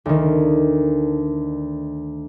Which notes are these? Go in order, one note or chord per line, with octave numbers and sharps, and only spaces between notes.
D2 D#3